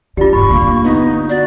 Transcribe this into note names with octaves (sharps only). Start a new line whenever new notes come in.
D3 F4 G4 D5
E1 G2 B5 C#6
D3 A#3
B3 D#4
F#4 D5